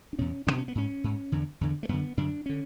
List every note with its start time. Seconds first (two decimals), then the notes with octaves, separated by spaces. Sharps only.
0.13 D4
0.19 E2 B2 C#4
0.47 E2 B2 D4
0.58 C#4
0.68 B3
0.75 G#2 C#4
1.04 G#2
1.32 E2 D3
1.61 E2 D3
1.83 A3
1.89 F#2 D3 B3
2.17 F#2 D3 D4
2.46 D3 C#4